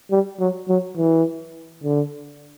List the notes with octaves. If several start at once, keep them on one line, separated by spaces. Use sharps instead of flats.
G3
F#3
F#3
E3
D3